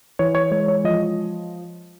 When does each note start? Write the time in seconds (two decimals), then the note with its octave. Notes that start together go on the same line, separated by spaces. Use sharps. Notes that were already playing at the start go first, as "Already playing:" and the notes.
0.19 E3 C#5
0.35 C#5
0.51 G#3 C#5
0.68 C#5
0.84 F3 D#5